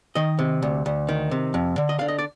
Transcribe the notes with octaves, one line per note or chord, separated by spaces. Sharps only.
D#3 D#5
C3
D2
D2
D#3
C3
F2
D3
D#5
D3 F5
D#5
D5